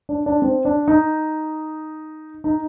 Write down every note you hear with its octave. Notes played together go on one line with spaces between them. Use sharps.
D4
D4
C4
D4
D#4
D#4